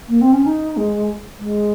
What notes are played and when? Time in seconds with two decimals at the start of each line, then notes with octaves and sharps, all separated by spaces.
0.09 A#3
0.21 C4
0.33 C#4
0.46 D#4
0.77 G#3
1.39 G#3